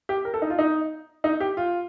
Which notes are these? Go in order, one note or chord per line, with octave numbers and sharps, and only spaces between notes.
G4
A#4
A4
D#4
F4
D#4
D#4
G4
F4